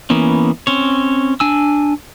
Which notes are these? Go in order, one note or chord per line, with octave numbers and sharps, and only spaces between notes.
E3 A#3 B3 C#4
C4 C#4 C#5
D4 G#5 E6